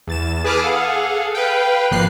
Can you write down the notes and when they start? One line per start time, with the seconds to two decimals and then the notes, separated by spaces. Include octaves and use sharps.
0.07 E2 A6 E7
0.44 G#4 B4 A5 D6 D#6 F6
0.62 G#4 A4 F5 F#5
1.35 B4 F5 G5
1.91 G#1 F3 A#3 F#6 C7